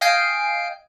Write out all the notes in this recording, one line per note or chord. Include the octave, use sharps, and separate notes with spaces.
D#5 F5 G5 G#5 C7 D7